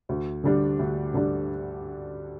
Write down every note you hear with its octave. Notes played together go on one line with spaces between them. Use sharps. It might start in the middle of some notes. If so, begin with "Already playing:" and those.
D2
D3 G3 D4
D2
D3 G3 D4